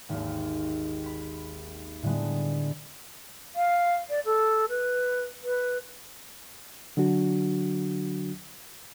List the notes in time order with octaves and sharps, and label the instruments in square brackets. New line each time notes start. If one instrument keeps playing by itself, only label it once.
[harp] G#1 D#2
B5 B6
A2 D3 G3 G#3 B3
[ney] F5
D5
A4
B4
B4
[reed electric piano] D3 F#3 D4 F#4